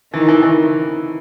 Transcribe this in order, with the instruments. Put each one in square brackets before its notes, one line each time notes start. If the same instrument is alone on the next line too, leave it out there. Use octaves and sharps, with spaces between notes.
[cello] D#3 [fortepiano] E3
[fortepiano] E3
E3